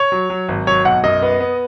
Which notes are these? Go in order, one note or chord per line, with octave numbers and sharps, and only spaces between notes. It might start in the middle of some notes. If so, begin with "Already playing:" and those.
Already playing: C#5
F#3
F#3
G#1
F#3 C#5
B1 F#5
F#2 D#5
B3
B3